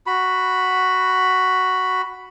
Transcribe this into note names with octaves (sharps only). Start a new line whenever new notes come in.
F#4 B5